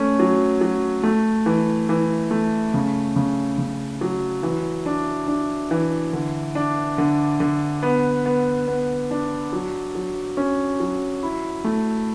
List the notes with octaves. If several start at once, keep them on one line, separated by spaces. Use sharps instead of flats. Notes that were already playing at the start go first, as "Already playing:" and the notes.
Already playing: A3 C#4
F#3
F#3
A3
E3
E3
A3
C#3
C#3
C#3
F#3
E3
D4
D4
E3
D3
D4
D3
D3
B3
B3
B3
D4
F#3
F#3
C#4
F#3
E4
A3